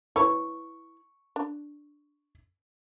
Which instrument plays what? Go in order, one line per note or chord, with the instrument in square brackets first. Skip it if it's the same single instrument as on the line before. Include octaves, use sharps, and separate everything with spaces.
[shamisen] E4 B4 C#5 [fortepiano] C#6
[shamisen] D4